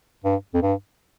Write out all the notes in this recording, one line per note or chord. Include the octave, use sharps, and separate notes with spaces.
G2
F2
G2